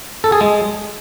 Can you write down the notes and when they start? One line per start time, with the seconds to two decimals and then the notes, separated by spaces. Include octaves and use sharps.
0.24 A4
0.32 G#4
0.41 G#3